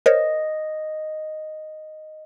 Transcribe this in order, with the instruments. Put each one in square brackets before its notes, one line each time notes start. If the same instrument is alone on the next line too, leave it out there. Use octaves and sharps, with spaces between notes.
[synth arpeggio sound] A#4 C5 C#5 [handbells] D#5